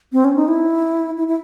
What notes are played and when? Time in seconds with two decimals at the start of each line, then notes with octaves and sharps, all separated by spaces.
0.13 C4
0.25 C#4
0.36 D#4
0.48 E4
1.18 E4
1.28 E4